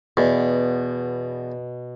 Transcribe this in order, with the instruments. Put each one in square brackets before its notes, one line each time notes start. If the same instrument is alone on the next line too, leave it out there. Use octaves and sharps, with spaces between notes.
[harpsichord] E2 [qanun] B2